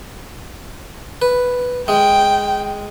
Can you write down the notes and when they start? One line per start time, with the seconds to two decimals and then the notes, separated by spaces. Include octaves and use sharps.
1.22 B4
1.88 G#3 G5